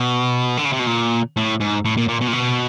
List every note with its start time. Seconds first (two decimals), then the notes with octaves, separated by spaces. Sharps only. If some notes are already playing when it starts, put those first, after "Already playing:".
Already playing: B2
0.58 D3
0.65 C#3
0.73 C3
0.80 B2
0.87 A#2
1.37 A2
1.60 G#2
1.85 A2
1.97 A#2
2.08 A#2
2.21 B2
2.28 A#2
2.33 B2